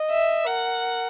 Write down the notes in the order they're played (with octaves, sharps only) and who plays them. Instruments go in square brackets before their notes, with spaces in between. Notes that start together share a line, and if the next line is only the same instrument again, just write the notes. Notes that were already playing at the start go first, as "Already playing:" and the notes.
Already playing: [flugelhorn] D#5
[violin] E5
[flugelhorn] A#4 [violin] F#5